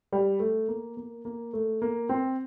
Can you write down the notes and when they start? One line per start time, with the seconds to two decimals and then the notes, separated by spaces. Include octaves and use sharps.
0.12 G3
0.40 A3
0.68 A#3
0.97 A#3
1.25 A#3
1.53 A3
1.82 A#3
2.09 C4